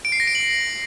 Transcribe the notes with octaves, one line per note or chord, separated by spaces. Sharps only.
D7
C7
A#6
D7
F#7